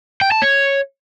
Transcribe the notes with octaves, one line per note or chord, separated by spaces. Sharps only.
G5
A5
C#5